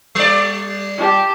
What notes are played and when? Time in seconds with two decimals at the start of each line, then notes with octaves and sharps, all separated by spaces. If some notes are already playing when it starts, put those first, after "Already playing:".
0.15 G3 D5
0.97 G4 A5